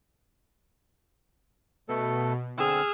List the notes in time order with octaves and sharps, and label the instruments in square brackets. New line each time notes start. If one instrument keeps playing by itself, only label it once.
[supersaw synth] B2 [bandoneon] A3 A4
[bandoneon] D3 C4 [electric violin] G#4 [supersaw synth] E6 F6